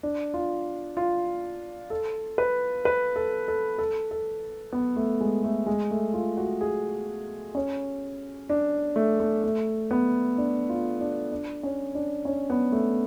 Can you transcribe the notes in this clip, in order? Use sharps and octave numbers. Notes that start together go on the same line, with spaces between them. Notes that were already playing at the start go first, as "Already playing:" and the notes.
D4
F4
F4
A4
B4
B4
A4
A4
A4
A4
B3
A3
G#3
A3
G#3
A3
F4
F#4
G#4
C#4
D4
A3
A3
A3
B3
D4
F4
D4
D4
C#4
D4
C#4
B3
A3